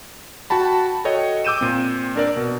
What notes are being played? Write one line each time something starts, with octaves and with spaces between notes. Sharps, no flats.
F#4 G5 A5 B5
F#4 A4 C#5 D#5 G5
D6 E6 G6 D#7 E7
A#2 C4
D4 A#4 D5
B2